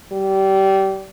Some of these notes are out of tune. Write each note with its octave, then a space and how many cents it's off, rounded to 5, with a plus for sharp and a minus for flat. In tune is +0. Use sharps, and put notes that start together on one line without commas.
G3 -25